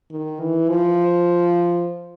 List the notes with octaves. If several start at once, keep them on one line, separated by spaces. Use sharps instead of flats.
D#3
E3
F3